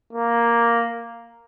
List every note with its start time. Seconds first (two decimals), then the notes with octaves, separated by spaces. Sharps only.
0.13 A#3